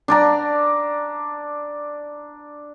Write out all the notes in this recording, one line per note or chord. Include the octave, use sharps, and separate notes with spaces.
D4 D5 A#5